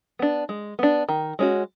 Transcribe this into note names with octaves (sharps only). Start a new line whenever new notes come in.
B3 D4
G#3
B3 D4
D#3
G#3 C#4 F#4